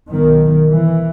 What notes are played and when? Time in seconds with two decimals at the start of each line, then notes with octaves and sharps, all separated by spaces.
0.11 B1 B2 D#3
0.70 E3